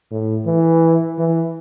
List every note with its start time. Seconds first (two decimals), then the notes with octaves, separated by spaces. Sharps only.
0.11 A2
0.46 E3
1.18 E3